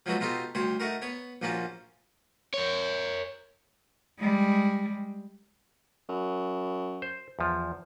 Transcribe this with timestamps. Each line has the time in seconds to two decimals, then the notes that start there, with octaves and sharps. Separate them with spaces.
0.06 F3 F#3 G#3 B3 F#4 A4
0.21 B2 D#4 F4 G4 A4
0.55 D2 G3 C5 C#5
0.80 A3 D#4 F#4 A#4
1.02 B3 C#5
1.42 A#1 F3 A#3 C#4 F#4 A5
2.54 A#4 C#5
4.19 G3 G#3
6.09 F#2
7.02 C5
7.39 E2 F3